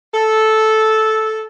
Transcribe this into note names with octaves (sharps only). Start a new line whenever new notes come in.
A4